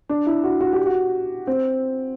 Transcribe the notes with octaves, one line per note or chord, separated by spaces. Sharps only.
D4
E4
F#4
F#4
G4
F#4
C4